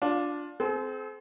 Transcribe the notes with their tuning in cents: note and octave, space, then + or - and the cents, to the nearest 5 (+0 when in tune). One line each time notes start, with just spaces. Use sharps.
D4 -5 F4 +20
C4 -15 G#4 +45